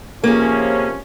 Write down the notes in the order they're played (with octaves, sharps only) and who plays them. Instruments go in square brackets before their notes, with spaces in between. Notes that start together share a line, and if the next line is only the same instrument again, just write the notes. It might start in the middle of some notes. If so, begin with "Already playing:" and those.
[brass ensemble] C3 F3 C#4 [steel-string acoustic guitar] A#3 G#4